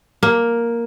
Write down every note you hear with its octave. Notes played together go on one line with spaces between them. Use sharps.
A#3